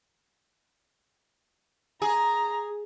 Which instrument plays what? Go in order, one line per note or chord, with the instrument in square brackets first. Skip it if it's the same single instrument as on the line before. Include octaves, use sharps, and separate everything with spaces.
[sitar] G#4 [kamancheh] A#5